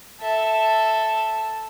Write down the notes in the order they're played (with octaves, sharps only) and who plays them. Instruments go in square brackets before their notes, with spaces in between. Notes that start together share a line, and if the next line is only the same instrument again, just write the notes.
[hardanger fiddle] A4 E5